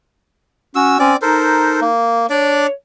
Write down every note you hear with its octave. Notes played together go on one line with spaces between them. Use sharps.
C#4 F#4 E6
C4 C#4 D5
D#4 A4 A#4 C5
A#3
D4 C#5 D5